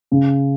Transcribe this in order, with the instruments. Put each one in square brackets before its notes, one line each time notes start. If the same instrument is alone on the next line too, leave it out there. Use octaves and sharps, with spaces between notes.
[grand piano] C#3